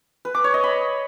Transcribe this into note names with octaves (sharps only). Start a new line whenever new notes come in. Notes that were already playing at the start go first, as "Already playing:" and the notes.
B4
D6
C#5
D#5
B5